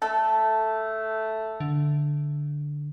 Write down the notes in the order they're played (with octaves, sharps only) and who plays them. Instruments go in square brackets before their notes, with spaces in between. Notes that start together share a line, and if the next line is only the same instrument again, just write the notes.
[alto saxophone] A3 [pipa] A4
[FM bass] D3